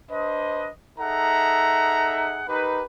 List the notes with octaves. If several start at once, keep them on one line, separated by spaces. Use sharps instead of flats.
D4 B4 C5 D#5
D#4 G#4 A4 E5 F#5 A#5
D#4 G4 A#4 B4